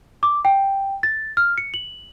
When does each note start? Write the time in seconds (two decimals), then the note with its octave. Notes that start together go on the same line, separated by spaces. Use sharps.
0.23 D6
0.45 G5
1.03 A6
1.37 F6
1.58 C#7
1.74 F#7